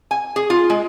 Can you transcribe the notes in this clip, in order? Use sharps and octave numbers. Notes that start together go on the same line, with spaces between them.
G#5
G#4
F4
G#3